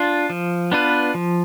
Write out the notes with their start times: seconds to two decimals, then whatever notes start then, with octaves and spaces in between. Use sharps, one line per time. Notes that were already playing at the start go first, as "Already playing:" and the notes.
Already playing: D4 F4
0.30 F3
0.72 B3 D4 F4 B4
1.14 F3